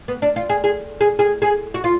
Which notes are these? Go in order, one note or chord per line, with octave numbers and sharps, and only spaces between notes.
B3
D4
F4
G#4
G#4
G#4
G#4
G#4
F#4
F4